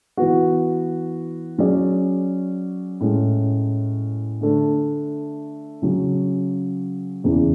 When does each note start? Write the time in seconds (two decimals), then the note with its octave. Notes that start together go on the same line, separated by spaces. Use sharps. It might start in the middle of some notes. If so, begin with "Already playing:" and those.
0.17 E3 B3 F#4
1.58 F#3 C#4 G#4 D5
3.00 A2 G#3 C#4
4.41 D3 A3 D4
5.82 C#3 F#3 C#4
7.24 E2 C#3 E3